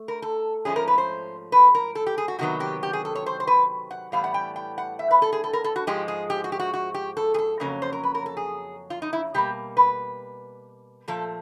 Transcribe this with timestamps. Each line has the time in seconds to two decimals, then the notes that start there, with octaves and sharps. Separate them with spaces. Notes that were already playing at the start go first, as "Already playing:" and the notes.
Already playing: A3
0.08 A#4
0.22 A4
0.65 G#2 F3 A3 C#4 G#4
0.76 A#4
0.88 B4
0.98 C5
1.52 B4
1.75 A#4
1.95 A4
2.07 G4
2.18 G#4
2.28 F#4
2.39 C3 D#3 F#3 B3 F#4
2.60 G4
2.83 G4
2.93 G#4
3.05 A4
3.15 C#5
3.26 C5
3.40 C5
3.47 B4
3.91 F#5
4.12 A2 E3 G3 B3 F5
4.24 F#5
4.34 G5
4.56 G5
4.78 F#5
4.99 E5
5.11 B4
5.22 A4
5.32 G#4
5.44 A4
5.53 A#4
5.64 A4
5.76 F#4
5.87 G#2 F3 G#3 G4
6.08 G#4
6.30 G4
6.44 F#4
6.52 G4
6.59 F#4
6.74 F#4
6.94 G4
7.17 A4
7.34 G#4
7.38 A4
7.60 F2 C#3 F#3 A#3 C#4 A#4
7.82 C5
7.93 A#4
8.03 B4
8.15 A#4
8.26 A4
8.37 G#4
8.90 F4
9.02 D#4
9.13 E4
9.34 B2 G3 A#3 G4
9.77 B4
11.08 A#2 F3 A3 A4